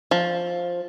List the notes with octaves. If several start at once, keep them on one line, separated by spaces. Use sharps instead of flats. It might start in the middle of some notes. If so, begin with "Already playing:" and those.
F3